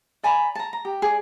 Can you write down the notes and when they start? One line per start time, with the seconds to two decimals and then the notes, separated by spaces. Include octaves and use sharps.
0.23 D5 G#5 A#5 B5
0.55 A5 A#5
0.73 A#5
0.85 G4
1.02 G#4 D5